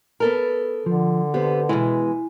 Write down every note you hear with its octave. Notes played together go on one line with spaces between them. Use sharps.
B3 A4 A#4
D3 F3
B3 G4 C5
B2 E3 G#3 E4 G#5